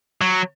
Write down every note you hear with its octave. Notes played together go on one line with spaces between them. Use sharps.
F#3